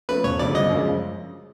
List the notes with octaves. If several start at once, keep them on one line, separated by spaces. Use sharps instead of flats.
F3 A3 C#4 B4
E1 C#5
D2 C#3 F3 D5
G1 D#5
F#2 C#3 F3 G#3